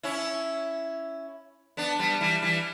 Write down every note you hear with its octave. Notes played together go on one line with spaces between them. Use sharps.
C#4 E4
B3 D4
G3 B3
E3 G3
E3 G3